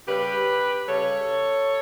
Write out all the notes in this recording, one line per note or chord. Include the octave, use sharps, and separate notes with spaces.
C#3 G3 G4 B4
C#3 G3 A4 C#5